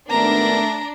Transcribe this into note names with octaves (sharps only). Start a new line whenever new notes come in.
G#1 A3 B3 D4 A#4 A#5